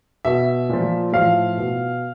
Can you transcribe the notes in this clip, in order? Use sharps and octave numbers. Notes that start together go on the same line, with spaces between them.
B2 E5
A#2 F3
A2 F3 F5
B2